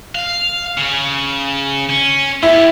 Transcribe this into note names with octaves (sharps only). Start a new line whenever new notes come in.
F5
C#3
C#4
B3 E4 G4